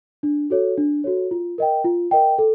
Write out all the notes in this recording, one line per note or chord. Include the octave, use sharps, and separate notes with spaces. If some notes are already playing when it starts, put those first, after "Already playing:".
D4
F#4 A4 C#5
D4
F#4 A4 C#5
F4
A#4 D#5 G5
F4
A#4 D#5 G5
A4